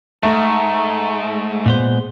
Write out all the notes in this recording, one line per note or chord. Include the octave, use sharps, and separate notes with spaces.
G#2 A3 A#5
A#2 G#3 B3 C5